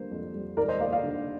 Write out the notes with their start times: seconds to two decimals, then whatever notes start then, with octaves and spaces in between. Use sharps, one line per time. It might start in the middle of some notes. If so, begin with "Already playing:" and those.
Already playing: D3 G3 A#3 C5
0.11 F2
0.34 G3
0.57 D#2 A#4 D5
0.68 C5 D#5
0.80 A#3 D5 F5
0.92 D5 F5
1.03 D3